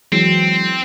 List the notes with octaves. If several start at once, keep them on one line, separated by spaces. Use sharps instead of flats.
E3 F#3 G#3 C4